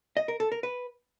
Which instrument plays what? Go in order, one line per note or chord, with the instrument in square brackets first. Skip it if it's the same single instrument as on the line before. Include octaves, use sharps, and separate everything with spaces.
[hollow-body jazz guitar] D#5
A#4
A4
A#4
B4